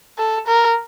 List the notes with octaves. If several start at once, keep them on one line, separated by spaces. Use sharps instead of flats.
A4
A#4